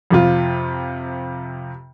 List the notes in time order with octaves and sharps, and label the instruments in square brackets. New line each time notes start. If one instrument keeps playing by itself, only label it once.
[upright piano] F2 C3 F4